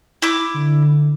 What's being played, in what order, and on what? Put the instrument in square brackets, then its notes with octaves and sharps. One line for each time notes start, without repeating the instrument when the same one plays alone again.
[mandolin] E4 D6
[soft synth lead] D3